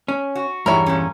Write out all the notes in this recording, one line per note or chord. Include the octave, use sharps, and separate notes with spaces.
C#4
F#4
E2 G2 G3 E4 A#4 C#5 E5
A#2 C#4